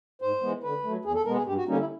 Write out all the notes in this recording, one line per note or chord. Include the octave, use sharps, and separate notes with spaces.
G#2 C5
E3 G#3 B3
D3 B4
F#3 A3
E2 G#4
A4
B2 G#3 B3 A#4
G#4
G2 G4
F#4
D3 G3 A#3 C#4 D#4
E4